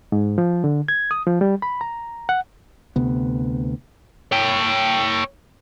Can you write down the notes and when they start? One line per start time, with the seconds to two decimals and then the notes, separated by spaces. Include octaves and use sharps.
0.12 G#2
0.38 F3
0.64 D3
0.88 G#6
1.11 D#6
1.27 F3
1.41 G3
1.62 B5
1.81 A#5
2.29 F#5
2.96 D2 C3 B3
4.32 C#5 G5